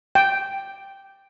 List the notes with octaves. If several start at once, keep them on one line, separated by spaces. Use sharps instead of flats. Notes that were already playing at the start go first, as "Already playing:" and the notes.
G5